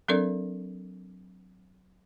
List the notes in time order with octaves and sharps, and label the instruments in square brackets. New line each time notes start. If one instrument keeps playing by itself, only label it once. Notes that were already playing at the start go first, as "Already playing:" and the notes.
[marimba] F#3 C4 D4 A4 A#4 D5